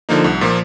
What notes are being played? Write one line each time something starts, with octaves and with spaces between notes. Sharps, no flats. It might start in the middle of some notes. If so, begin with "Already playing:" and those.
D3 F3 A#3 D#4
C2
A#2 F3 A#3